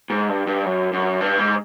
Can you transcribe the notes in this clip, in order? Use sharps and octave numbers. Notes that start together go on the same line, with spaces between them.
G#2
G2
G2
F#2
F#2
G2
G#2